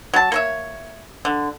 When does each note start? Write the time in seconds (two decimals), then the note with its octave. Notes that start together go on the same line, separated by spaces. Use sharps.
0.14 F#3 A5
0.32 A#3 C#5 E5
1.25 D3